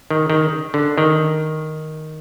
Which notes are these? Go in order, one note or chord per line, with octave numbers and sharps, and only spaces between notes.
D#3
D#3
D3
D#3